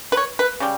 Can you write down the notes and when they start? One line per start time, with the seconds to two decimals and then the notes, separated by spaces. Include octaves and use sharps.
0.12 B4
0.17 C#5
0.39 B4
0.60 C#3 G3